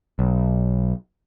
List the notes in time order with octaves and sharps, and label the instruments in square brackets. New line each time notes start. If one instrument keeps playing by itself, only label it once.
[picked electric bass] B1